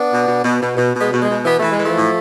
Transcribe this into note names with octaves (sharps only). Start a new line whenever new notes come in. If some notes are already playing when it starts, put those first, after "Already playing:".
Already playing: B3 D4
B2
B2
B2
B2
B2
B2
G#3 B3
B2
G#3
B2
E3 B3
E3 A3
G#3
E3
F3 A3
A2